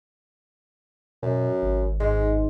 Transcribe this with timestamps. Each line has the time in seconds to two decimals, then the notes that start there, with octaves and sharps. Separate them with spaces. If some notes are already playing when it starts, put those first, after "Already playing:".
1.23 F#2 B2
1.62 G#1
2.00 G#2 G#3